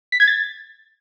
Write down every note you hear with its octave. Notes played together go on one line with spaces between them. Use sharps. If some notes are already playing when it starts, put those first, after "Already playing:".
B6
G#6
A6